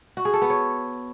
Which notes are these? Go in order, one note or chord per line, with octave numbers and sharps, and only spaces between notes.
F#4
G#4
A4
B3
C#5